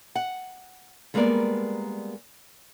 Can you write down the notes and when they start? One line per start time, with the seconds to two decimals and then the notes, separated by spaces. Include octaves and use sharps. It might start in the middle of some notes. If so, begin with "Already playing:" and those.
0.15 F#5
1.14 G3 G#3 A#3 B3 A#4 D5